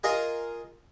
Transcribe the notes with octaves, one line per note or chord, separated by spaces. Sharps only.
F4 G#4 A#4 D#5 G#5